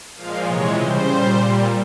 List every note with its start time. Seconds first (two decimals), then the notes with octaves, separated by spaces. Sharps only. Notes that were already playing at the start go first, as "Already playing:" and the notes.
0.15 A#2 F3 G#3 F5
0.46 C3 E3 G#3 C#5
0.76 C#3 G3 C5
1.07 A#2 G3
1.37 A#2 G3